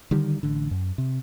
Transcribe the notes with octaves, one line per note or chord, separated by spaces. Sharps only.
D3 D#3 G3
A1 D3
F#2
C3